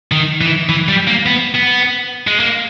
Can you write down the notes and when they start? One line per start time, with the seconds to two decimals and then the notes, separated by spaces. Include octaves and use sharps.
0.12 D#3
0.41 E3
0.69 E3
0.88 G3
1.08 A#3
1.26 B3
1.55 B3
2.27 G#3
2.40 A#3